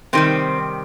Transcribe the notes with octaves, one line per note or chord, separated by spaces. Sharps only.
C3 D#3 G3 C4